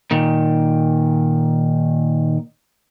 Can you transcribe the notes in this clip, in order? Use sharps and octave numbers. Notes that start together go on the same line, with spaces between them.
A#2 D#3